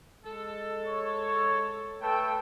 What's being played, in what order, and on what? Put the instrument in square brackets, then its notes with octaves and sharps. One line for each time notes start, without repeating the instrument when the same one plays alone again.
[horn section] G#3 A4
[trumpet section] C#5
[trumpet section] A3 A4 [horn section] B4 G5